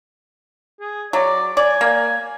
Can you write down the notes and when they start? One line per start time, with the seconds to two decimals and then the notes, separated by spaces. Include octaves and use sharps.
0.80 G#4
1.13 F#3 D5
1.57 D5 G#5
1.81 A#3